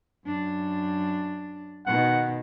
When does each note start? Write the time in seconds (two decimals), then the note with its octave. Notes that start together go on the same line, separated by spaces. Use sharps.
0.26 F#2 D4
1.87 B2 D#3 F#5